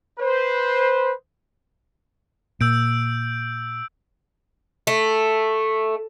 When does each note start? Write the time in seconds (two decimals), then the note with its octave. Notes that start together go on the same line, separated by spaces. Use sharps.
0.19 B4 C5
2.61 A#2 E6 G6 D7
4.87 A3